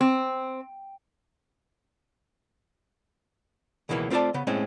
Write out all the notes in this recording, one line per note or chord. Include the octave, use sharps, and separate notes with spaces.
C4
C#2 B2 D#3 E3 G3 A#3
A3 C4 F4 A4 D5 A5
C#3 B3
A2 G#3 C4 C#4